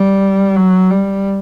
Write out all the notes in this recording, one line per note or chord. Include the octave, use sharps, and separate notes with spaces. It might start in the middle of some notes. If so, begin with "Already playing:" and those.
Already playing: G3
F#3
G3